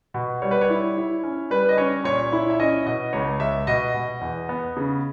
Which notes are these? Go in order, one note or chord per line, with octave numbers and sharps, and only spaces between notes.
B2
G3 C#5
B4
C#5
E4
E4
C#4
G3 B4
D#5
C#4 C#5
A#2 C#5
E4
E5
C#4 D#5
B2 D#5
C#2 C#5
C#2 E5
B2 D#5
B2
E2
B3
C#3